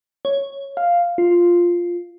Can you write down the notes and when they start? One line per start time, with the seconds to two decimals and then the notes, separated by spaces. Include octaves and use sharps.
0.25 C#5
0.77 F5
1.18 F4